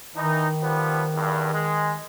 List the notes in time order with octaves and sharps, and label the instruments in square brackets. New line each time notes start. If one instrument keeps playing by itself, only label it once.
[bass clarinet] D#3 [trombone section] E3 D#4
[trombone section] F3 G3 B3
E2 G2
G#3